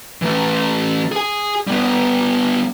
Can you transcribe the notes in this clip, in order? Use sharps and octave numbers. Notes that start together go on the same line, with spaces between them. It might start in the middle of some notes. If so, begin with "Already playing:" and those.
E3 A3
G#4 G#5
G3 B3